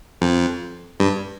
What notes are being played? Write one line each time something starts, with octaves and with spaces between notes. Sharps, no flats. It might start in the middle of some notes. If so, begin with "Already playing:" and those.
F2
G2